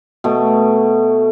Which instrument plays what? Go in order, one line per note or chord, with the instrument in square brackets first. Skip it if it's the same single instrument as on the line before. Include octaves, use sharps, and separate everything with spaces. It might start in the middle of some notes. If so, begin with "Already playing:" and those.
[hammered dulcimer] B2 A3